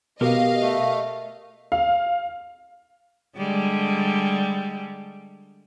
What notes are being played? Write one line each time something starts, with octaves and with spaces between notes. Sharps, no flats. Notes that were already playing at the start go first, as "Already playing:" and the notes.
B2 F#4 G4 A#4 D#5 F5
A3
F5
D3 G3 G#3